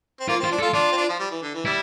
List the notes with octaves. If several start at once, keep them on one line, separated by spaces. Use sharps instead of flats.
C4
A#3 F4
C4
F4
D4
A4
F4
D4 F4
C4
D4
F3
G3
E3
D3
E3
G3 E4